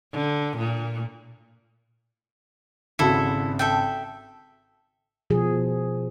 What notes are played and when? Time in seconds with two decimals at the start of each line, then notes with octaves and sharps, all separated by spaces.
0.13 D3
0.58 A#2
2.99 G#1 C#3 E4 F#4 A4
3.59 A4 E5 G5
5.30 B2 F3 G#4